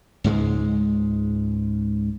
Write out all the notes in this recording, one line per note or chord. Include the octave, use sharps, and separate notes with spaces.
C#2 G#2 G#3